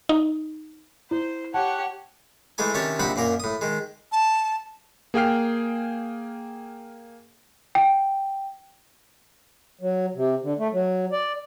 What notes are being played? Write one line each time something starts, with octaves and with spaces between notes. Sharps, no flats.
D#4
E4 C5
G4 C#5 F#5 A5
E3 G#3 A3 D#4 G#5
C3 D#3 C#4 C#5 A5 C#6
A#1 C3 D#4 C5 F#5 B5
F#2 A#2 A#3 A#4
A2 D#6
D#3 G#3
A5
A#3 G#4 F5 G5 F6 C7
G5
F#3
C3
D3
A3
F#3
D5